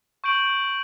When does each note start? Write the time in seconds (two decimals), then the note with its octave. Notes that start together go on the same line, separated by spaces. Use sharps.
0.24 C#6 G6 D7 F#7